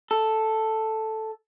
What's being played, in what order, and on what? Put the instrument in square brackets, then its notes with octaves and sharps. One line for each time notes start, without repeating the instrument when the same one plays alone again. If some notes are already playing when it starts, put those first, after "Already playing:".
[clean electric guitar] A4